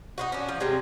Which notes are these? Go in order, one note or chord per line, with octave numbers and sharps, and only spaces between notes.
D#4 F4 F#4
C#4 D4
F3
C3 G3 G#3 C4